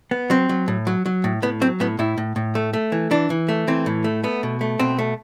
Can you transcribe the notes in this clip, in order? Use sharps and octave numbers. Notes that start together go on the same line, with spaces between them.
B3
F#3 C4
F#3
A2
F#3
F#3
A2
A2 B3
F#3 C4
A2 B3
A2 E4
A2
A2
A3
A3
E3
E3 D4
E3
A3
E3 C4
A2
A3
A3 B3
B2
A3
B2 C4
A3